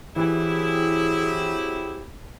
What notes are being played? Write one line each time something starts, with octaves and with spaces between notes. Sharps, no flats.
E3 F#3 C4 E4 G4 G#4